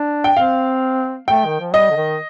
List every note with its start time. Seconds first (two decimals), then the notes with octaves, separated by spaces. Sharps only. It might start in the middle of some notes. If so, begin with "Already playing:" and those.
Already playing: D4
0.24 G5
0.37 C4 F5
1.28 A3 G5
1.46 D#3
1.60 F3
1.74 G3 D#5
1.90 D3
1.96 D#3